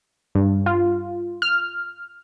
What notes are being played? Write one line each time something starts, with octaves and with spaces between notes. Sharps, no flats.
G2
F4
F6